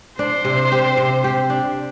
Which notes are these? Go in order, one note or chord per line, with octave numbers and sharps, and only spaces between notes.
D4 C5
C3
G4
C3
G4
D4